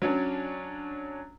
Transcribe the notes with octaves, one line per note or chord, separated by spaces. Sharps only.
F#3 C#4 D4